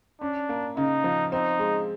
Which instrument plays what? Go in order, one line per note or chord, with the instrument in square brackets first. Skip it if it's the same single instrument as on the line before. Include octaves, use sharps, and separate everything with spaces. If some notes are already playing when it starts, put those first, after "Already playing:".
[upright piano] C#4 [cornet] D4
[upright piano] A#3
[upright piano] C#3 [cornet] D#4
[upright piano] F3
[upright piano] C4 [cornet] D#4
[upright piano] G#3